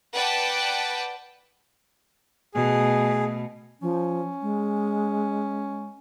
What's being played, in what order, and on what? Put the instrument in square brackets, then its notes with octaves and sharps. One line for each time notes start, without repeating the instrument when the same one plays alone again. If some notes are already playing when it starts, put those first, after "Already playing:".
[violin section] B4 D5 F#5 G5 A5
[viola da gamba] B2 A3 [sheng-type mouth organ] G#4
[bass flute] F3 [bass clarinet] C#4
[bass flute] G#3